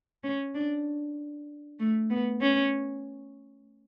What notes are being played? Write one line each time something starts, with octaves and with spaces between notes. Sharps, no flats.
C#4
D4
A3
B3
C#4